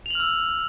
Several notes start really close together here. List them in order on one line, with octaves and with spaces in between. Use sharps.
F7 F#7 F6 E6